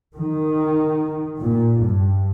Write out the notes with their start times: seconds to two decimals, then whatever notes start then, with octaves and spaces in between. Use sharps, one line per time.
0.15 D#3
1.39 A#2
1.81 G2